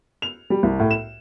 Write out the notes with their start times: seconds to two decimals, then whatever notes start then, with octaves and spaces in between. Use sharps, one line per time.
0.22 F7
0.50 G3
0.63 C2
0.79 A2
0.91 E7